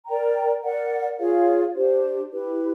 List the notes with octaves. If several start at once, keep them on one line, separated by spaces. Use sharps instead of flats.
A#4 D5 G5 A#5
A#4 D5 F#5
F4 G#4 C#5 F5
D4 G4 C5
E4 G4 B4